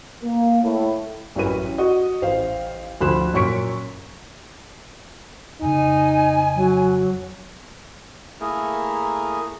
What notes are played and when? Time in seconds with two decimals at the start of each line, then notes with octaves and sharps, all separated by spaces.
0.23 A#3
0.63 A2
1.36 A1 F#2 E3 C#4 B4 D#7
1.78 F#4 D#5
2.22 A1 C5 F5
3.01 D2 F3 B5 C6 F#6 E7
3.34 F#2 A#2 C#5 C#6 B6 D7
5.62 F2 C#3 D#4 G#5
6.55 F#3
8.41 A3 A#3 E4 G#4 A#4